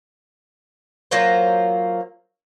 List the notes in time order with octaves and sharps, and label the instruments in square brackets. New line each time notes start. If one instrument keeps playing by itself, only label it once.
[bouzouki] F#3 A#3 F4 C5